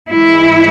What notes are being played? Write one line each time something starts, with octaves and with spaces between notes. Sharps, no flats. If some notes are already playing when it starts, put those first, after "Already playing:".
G#2 E3 G#3 E4